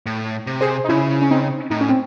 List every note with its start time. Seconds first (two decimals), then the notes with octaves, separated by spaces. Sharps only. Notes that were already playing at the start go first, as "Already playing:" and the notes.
0.06 A2
0.47 C3
0.61 G#4 C5
0.84 D#4
0.89 C#3 C#4 E4
1.22 C#4
1.31 C4 D#4
1.71 A2 D#4
1.81 C#4
1.89 C4